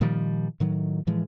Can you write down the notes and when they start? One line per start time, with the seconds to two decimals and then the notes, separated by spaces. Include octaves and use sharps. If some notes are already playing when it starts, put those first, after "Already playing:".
0.01 A#2 D#3 F3 G3
0.60 A2 D#3 F#3
1.07 A2 E3 F3 G#3